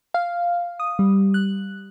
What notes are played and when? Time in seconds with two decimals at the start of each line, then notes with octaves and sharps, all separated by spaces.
0.14 F5
0.80 D#6
0.99 G3
1.34 F#6